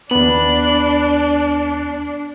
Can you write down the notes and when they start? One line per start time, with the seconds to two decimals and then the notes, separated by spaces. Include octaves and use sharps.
0.11 D#2 B3 D4 B5